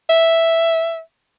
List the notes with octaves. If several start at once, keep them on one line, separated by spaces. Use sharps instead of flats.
E5